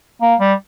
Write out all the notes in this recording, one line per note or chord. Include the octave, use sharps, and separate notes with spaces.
A#3
G3